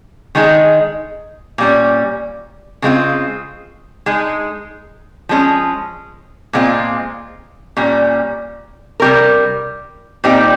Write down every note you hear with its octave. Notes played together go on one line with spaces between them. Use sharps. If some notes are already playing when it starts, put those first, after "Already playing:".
D#3 G#3 D#4 G#4
A#2 G3 C#4
C#3 G#3 C4 F4
G#3 D#4 G#4
F3 G#3 C#4
A#2 G#3 C4 F4
A#2 G3 C#4
C3 G3 C#4 G4 A#4
A#2 G3 C4 D#4 G4